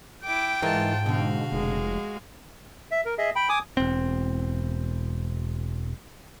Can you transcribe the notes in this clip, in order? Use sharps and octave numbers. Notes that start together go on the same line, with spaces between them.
E4 G5 D6
G#2 E3 D#4 F4 A#4 A5
B2 D3 F#4 F5
F1 G#3
E5
A#4
G#4 D#5 E5
G5 B5
G#5 D6 D#6
E1 C4